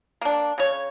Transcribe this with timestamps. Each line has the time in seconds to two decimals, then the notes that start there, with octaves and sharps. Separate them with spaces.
0.21 A#3 D4
0.58 C#3 C#5